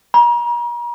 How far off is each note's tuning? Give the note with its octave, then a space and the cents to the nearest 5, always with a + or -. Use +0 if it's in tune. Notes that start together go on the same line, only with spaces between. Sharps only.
A#5 +40